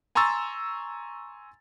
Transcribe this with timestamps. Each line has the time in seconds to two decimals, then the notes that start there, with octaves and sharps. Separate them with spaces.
0.15 G#5 A#5 C6 C#6 E6 A6